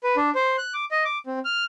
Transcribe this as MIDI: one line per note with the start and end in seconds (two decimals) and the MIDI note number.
0.03 0.16 71
0.17 0.30 62
0.35 0.57 72
0.58 0.74 90
0.74 0.85 86
0.91 1.04 75
1.05 1.18 86
1.26 1.39 60
1.45 1.64 89